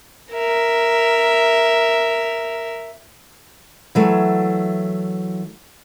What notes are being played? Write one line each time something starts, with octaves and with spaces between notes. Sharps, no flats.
A#4 E5
E3 F#3 A3